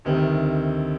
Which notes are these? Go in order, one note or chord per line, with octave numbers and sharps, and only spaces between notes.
D2 C3 D#3 G3 C4